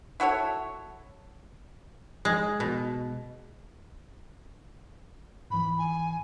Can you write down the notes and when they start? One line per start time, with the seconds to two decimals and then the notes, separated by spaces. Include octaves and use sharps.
0.20 E4 F#4 A4 C#5
2.25 G#3
2.60 B2
5.50 G#2 E3 B5
5.78 G#5